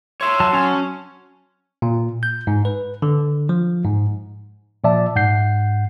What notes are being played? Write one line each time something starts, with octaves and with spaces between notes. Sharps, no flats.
C#5 E5 C6
F#3 A5
C#4
A#2
G6
G#2
B4
D3
F3
G#2
A#2 F3 D5 E5 A5
G#2 F#5 G6 C7